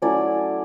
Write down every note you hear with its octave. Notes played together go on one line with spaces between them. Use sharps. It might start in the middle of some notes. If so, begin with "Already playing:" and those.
F#3 A3 C#4 E4 D5